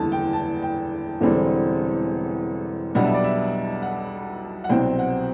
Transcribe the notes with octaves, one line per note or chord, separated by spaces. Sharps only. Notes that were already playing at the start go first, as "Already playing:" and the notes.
Already playing: F#1 E2 D3 G3 A5
G5
A5
G5
E1 E2 D3 G3 C4
B1 B2 G3 B3 D4 F#5
E5
D5
E5
F#5
F#5
C2 B2 F#3 C4 G5
F#5